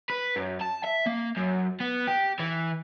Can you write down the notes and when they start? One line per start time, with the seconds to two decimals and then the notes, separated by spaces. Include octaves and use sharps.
0.10 B4
0.36 F#2
0.61 A5
0.85 E5
1.07 A#3
1.37 F#2
1.80 B3
2.07 G4
2.39 E3